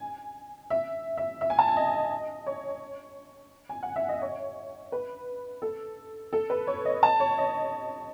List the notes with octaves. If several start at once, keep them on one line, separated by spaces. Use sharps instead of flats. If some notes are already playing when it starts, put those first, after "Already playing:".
Already playing: G#5
E5
E5
E5
G#5
A5
G#5
D#5
C#5
G#5
F#5
E5
D#5
C#5
B4
A4
A4
B4
C#5
D#5
A5
C#5
D#5